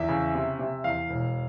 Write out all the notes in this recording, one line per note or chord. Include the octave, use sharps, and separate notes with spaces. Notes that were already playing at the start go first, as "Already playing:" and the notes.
Already playing: E2 E5
C#3
C3
C3
E2 F5
E1